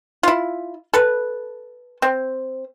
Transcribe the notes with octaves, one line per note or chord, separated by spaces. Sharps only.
E4 F4
A4 B4
C4